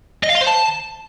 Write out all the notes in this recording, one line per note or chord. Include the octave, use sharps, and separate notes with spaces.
D#5
F5
C6
C5
A5